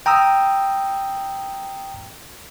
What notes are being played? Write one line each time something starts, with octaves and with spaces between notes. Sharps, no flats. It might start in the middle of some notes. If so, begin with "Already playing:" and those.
G5 A#5 D#6 E6